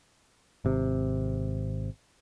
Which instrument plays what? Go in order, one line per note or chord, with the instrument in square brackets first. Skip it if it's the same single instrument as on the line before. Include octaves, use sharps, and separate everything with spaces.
[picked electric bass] G#1 C3